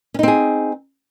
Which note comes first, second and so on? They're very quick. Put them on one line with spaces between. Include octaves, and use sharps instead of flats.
C#4 D#4 C4 G#4